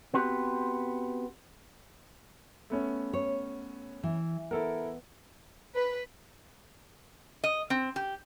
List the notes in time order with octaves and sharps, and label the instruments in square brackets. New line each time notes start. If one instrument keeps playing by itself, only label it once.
[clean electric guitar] B3 C4 F#4 G4
[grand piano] A3 B3 C#4
[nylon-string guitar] C#5
E3
[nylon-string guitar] B3 [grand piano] E4 A4 A#4
[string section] B4
[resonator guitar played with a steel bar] D#5
C4
G4